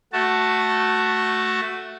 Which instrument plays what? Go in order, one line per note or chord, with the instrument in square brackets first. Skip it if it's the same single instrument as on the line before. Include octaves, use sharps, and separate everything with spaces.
[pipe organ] A3 F#4 A5